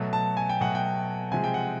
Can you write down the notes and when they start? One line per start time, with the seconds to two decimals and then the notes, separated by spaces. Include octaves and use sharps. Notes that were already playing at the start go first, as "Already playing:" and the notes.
Already playing: B2 F#3 A3
0.13 A5
0.37 G#5
0.49 G5
0.61 B2 F#3 A3 F#5
0.75 G5
1.31 C3 F3 G#3 G#5
1.44 G5
1.54 F#5